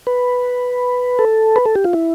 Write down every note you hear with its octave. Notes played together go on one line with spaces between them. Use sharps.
B4
A4
B4
A4
G4
F4
E4